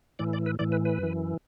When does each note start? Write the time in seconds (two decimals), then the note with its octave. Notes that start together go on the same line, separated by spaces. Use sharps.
0.19 A2 E3 D5
0.33 D5
0.46 B4
0.59 A2 E3 D5
0.72 B4
0.85 B4
0.98 F#2 E3